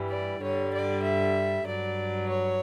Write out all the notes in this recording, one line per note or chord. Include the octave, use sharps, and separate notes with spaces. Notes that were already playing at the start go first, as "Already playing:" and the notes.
Already playing: G2 E3 G3
D5
G2 D3 G3 C#5
D5
E5
G2 F#3 D5
C#5